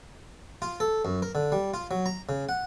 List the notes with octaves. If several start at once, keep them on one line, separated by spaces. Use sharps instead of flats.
F4
A4
F#2
A#4
D3
G3
F4
F#3
A#5
C#3
F#5